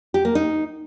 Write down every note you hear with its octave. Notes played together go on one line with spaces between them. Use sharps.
G4
A#3
D#4